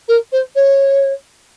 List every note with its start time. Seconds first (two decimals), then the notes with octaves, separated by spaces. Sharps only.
0.08 A#4
0.32 C5
0.56 C#5